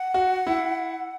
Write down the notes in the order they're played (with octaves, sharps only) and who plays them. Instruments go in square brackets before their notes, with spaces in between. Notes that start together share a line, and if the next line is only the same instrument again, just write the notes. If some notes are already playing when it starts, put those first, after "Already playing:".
Already playing: [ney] F#5
[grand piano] F#4
E4